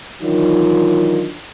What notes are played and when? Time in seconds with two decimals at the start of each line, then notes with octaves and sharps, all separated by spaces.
0.22 D#3 E3 F#3 D4 D#4 F4